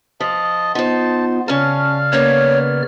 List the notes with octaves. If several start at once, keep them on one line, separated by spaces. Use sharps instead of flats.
F3 D#5 A5
B3 D#4 F4 C5 A5
C#3 C#4 D5 F5 A5 F6
A#3 B3 C#4 C#5